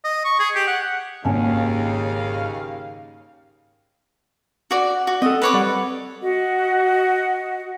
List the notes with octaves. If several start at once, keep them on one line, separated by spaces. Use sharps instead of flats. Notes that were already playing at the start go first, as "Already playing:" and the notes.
D#5
C#6
G#4
G4
F#5
G#1 D#2 C#3 A#3 C#4 F5 G#5 A5
F#4 D5
F#4
C4 A4 D#5
B4 C#5 D6
G3 D5 F#5
F#4 D#5 F#5